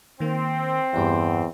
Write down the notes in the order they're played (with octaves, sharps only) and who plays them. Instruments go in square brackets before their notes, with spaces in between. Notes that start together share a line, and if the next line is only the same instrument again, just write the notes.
[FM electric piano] D#3 A#3 [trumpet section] C4
[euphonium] E2 [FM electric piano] G2 G4 F#5